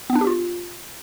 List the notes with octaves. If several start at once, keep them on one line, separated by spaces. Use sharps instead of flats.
B3
D4
G4
F4